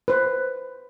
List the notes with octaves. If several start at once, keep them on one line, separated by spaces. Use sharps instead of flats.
B4 C5